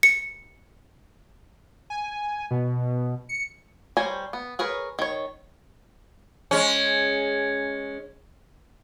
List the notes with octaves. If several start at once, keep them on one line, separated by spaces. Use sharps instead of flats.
C#7
G#5
B2
C#7
G3 A#4 C5 C#5 G#5
B3
G#4 A#4 B4 C#5
D#3 C#5
G#3 C#4